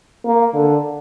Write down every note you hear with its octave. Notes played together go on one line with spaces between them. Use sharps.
A#3
D3